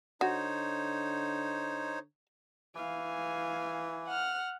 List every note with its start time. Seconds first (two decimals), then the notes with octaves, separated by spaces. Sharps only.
0.21 D3 D#4 F#4 C5 C#5
2.76 E3 F5 G#5
4.07 F#5 F6